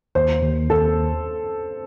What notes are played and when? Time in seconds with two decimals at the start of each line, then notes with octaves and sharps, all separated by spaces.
0.15 D#2 C5
0.42 D#2
0.70 D#2 A4